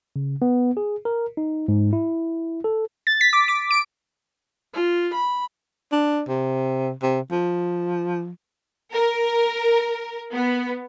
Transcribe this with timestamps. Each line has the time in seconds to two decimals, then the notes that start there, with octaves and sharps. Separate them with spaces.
0.16 C#3
0.42 B3
0.77 G#4
1.05 A#4
1.37 D#4
1.68 G#2
1.93 E4
2.64 A4
3.07 A6
3.21 B6
3.33 D6
3.48 D6
3.71 D7
4.74 F4
5.14 B5
5.92 D4
6.28 C3
7.02 C3
7.31 F3
8.92 A#4
10.34 B3